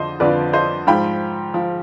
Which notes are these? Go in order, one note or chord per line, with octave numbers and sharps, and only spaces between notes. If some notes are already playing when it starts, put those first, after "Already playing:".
Already playing: F2 D3 F3 C5 D#5
F2 D3 F3 B4 D5
C5 D#5
G#2 F3 G5 B5
F3